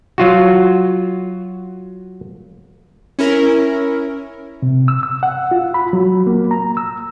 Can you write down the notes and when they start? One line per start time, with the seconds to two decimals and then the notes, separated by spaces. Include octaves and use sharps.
0.18 F#3 F4 F#4
3.19 C#4 E4 A#4
4.62 C3
4.88 E6
5.03 E6
5.23 F#5
5.51 F4
5.74 B5
5.93 F#3
6.27 A#3
6.51 A#5
6.77 E6